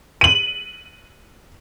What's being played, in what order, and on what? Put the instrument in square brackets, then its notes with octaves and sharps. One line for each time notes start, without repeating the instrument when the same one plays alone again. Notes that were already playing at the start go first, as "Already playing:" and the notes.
[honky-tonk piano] D#7 F#7